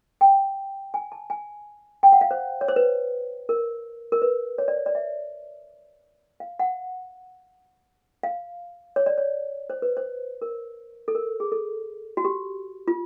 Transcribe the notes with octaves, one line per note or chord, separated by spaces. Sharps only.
G5
G#5
A5
G#5
G5
F#5
F5
C5
C#5
C5
B4
A#4
A#4
B4
C#5
D5
C#5
D5
E5
F5
F#5
F5
C#5
D5
C#5
C5
B4
C5
A#4
A4
A#4
G#4
A4
F#4
G4
F4